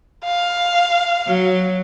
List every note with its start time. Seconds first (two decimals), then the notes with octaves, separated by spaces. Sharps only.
0.24 F5
1.27 F#3